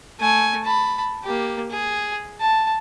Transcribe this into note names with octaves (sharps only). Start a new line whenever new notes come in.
A3 G#5
A5 B5
A#3 G4
G#4
A5